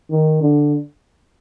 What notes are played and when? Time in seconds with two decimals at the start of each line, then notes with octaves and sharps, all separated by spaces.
0.11 D#3
0.42 D3